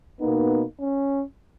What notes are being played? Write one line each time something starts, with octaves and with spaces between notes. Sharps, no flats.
B2 A#3 B3 D#4
C#4